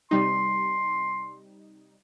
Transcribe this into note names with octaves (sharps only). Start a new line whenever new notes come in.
C3 G3 D#4 C6